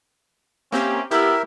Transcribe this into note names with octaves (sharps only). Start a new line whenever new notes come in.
A#3 C4 C#4 G4 E5
B3 E4 G4 A#4 E5 E6